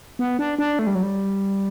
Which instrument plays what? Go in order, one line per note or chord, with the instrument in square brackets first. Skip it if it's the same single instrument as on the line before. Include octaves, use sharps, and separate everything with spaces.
[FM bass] B3
D4
D4
A3
G3
F#3
G3